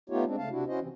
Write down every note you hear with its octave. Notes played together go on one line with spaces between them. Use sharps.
A3 B3 D#4 F4 G4 C#5
G#3 C4 D4
C#3 A3 F5 A5
C3 D4 E4 F#4
C#4 E4 F#4 C5 D#5
C3 E3 C4